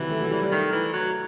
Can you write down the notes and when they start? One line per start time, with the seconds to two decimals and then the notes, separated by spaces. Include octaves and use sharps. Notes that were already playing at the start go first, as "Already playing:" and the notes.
Already playing: C3 D#3 E3 F#3
0.09 A3
0.22 F#3
0.31 G3
0.43 G3
0.51 D#3 A3
0.72 E3
0.93 F#3